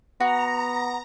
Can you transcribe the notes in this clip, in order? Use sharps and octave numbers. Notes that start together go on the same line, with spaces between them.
B3 F#4 A#5